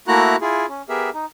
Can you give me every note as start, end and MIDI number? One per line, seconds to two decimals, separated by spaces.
0.08 0.36 57
0.08 0.36 58
0.08 0.36 64
0.08 0.36 66
0.08 0.36 82
0.08 0.36 90
0.41 0.66 64
0.41 0.66 65
0.41 0.66 68
0.68 0.82 61
0.89 1.10 59
0.89 1.10 67
0.89 1.10 68
0.89 1.10 70
0.89 1.10 76
1.14 1.26 63